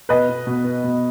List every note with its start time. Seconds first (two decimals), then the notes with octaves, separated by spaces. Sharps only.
0.09 B2 B4 D#5
0.29 B3
0.47 B2
0.64 B3
0.84 B2